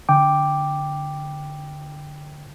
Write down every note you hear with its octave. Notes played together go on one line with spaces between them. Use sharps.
D3 G5 D6